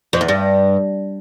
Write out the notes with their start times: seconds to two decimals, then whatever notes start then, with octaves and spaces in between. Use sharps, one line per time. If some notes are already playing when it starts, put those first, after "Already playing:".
0.13 F2
0.21 E2
0.29 G2